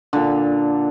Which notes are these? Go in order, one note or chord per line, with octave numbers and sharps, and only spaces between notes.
A#2 D3